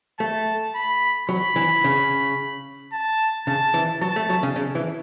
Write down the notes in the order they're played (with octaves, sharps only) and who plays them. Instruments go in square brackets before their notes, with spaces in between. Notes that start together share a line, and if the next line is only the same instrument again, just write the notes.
[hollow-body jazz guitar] A3 [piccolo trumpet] A5
[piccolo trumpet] B5
[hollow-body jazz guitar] F#3 [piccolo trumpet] B5
[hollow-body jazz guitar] E3
C#3
[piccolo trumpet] A5
[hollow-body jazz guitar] C#3 [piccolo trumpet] A5
[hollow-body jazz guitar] E3
[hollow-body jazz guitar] F#3 [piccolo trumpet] A5
[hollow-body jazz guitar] A3
F#3
C#3
C#3
E3